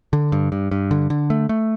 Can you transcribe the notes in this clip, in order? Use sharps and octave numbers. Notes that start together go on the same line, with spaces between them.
D3
G2
G2
G2
D3
D3
A3
A3